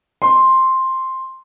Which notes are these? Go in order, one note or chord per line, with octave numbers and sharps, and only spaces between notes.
C6